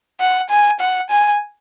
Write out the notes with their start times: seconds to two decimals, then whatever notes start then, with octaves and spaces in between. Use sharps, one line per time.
0.20 F#5
0.50 G#5
0.80 F#5
1.10 G#5